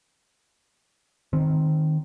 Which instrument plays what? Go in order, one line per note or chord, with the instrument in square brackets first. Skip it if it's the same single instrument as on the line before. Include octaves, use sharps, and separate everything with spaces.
[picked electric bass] D#3 C4